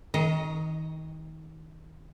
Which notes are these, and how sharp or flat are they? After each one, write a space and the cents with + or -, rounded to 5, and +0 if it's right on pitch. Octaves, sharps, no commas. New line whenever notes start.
D#3 +30 D#5 +0 A#5 +0